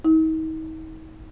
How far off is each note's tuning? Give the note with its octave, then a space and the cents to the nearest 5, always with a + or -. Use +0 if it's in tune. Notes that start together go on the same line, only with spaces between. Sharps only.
D#4 +40